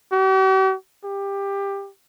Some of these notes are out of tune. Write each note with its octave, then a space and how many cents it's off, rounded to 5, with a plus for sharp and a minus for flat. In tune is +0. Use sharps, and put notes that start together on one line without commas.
G4 -45
G4 +20